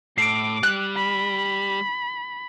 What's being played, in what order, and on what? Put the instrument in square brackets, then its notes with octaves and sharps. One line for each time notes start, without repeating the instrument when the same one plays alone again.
[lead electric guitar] A2 [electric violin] D6 [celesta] C7 D7
[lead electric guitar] G3 [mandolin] F#6
[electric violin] B5